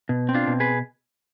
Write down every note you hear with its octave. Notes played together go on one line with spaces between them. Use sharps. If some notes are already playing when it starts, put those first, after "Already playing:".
B2
C4
D4 F4
B2
G#4 B4